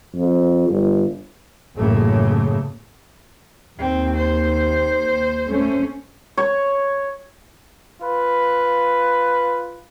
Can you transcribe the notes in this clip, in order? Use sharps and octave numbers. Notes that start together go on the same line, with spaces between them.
F2
G1
A1 F#2 A2 C#3 A3 A#3
D#2 C4
C5
A3 C#4
C#5
F4 B4